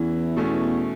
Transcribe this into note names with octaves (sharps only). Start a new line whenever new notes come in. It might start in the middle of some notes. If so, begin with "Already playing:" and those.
Already playing: E2 E3 C#4 E4
B2 A3 C#4